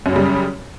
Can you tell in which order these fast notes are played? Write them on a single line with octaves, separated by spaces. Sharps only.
F#2 F#3 C#3 G3